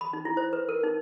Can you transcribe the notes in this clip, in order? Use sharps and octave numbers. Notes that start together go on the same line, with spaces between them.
B5
D#4
E4
C5
B4
A#4
D#4